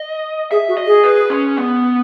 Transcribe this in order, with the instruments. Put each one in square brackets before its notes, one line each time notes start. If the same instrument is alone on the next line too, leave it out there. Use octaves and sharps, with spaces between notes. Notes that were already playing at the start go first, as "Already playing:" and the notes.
Already playing: [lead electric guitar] D#5
[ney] G#4 [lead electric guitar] E5
[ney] F#4
[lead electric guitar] D#5
[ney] G#4
[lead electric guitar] B4
C#4
B3